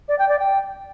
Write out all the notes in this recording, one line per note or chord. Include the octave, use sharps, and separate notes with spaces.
D5
G5
D5
G5